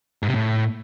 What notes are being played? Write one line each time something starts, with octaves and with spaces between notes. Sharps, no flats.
G#2
C3
A2